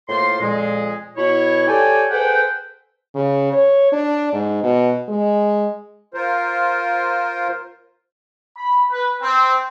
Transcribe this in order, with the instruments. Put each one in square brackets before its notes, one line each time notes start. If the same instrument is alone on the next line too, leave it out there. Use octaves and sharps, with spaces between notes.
[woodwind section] A2 A#3 F4 C5 C6
F2 A#2 G#3
B2 E4 C#5
G4 A4 C#5 D5 G5 G#5
G#4 A4 B4 C5 F#5 G5
[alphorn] C#3
C#5
D4
G#2
B2
G#3
[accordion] F4 A#4 C5
[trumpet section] B5
B4
C4